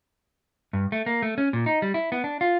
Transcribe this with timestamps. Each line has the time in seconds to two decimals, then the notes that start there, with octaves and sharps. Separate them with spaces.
0.73 G2
0.92 A3
1.06 A#3
1.22 A3
1.38 C#4
1.53 A#2
1.66 D#4
1.82 G3
1.94 E4
2.12 B3
2.24 D4
2.41 F4